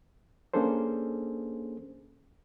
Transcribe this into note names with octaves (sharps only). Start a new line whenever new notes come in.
A#3 C#4 D4 G#4 A4 C5